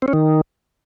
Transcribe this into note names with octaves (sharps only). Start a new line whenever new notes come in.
C4
C#4
D#3